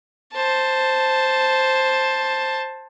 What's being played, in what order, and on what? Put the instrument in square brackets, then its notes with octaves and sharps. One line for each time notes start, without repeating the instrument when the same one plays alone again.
[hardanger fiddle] C5 A5